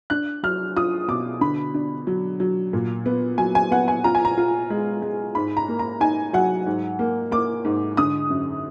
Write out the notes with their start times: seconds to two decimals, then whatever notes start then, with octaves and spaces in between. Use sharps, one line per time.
0.10 D4 F#6
0.43 F#3 F6
0.76 F4 D#6
1.08 B2 D6
1.41 D3 B5
1.74 D4
2.07 F#3
2.40 F#3
2.73 A#2
3.06 B3
3.38 F#3 G#5
3.55 G#5
3.71 B3 F#5
3.88 G#5
4.04 F4 A#5
4.15 G#5
4.25 A#5
4.37 F4
4.70 G#3
5.02 G#3
5.35 G#2 B5
5.57 A#5
5.68 A#3
5.79 A#5
6.00 D#4 G#5
6.33 F#3 F#5
6.67 G#2
6.99 A#3
7.31 A#3 D6
7.65 G#2
7.97 D3 D#6
8.30 F#2